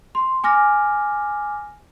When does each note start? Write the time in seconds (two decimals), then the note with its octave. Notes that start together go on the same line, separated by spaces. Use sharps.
0.15 C6
0.44 G#5 D6 F6 A#6